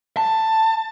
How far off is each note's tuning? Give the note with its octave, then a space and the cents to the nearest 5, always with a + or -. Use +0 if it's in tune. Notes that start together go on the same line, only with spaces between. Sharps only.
A5 +10